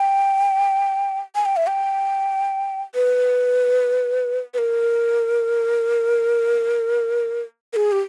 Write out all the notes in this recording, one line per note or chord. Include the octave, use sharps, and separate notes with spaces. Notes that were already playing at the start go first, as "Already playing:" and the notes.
Already playing: G5
G#5
G5
E5
G5
B4
B4
A#4
A#4
G#4
G4